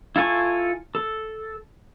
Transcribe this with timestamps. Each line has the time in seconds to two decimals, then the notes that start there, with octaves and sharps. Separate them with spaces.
0.16 E4 F4 A4 G#5 C#6
0.95 A4